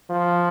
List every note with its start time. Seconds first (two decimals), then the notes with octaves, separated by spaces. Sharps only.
0.11 F3